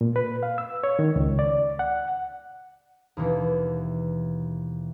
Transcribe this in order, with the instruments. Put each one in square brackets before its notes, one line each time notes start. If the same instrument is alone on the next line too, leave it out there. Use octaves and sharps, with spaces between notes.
[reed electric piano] A#2
B4
F5
E6
C#5
D#3
C#2
D5
F#5
[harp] D#2 B2 E3